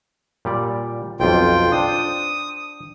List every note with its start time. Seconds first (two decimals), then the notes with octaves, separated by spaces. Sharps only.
0.45 A#2 G3 D5
1.20 B1 F2 F4 G5
1.72 D4 C5 D#6